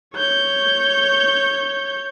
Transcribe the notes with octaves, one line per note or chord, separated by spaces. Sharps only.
C#5 G6